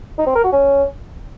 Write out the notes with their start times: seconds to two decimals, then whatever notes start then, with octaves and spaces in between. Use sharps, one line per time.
0.18 D#4
0.27 C4
0.35 A#4
0.44 F#4
0.52 C#4